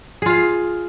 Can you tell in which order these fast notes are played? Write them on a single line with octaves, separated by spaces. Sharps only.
G#4 F4 F5